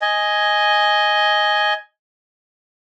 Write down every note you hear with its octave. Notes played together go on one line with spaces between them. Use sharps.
D#5 G#5